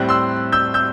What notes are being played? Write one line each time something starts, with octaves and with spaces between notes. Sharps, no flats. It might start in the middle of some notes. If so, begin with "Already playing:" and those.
Already playing: A2 G3 C4 F#6
C6 E6
E6 G6
E6 G6